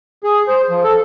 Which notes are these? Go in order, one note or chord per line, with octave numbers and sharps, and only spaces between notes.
G#4
C5
F3
A4